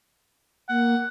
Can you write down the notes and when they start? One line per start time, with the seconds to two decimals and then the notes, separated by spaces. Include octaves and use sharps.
0.69 A#3 F#5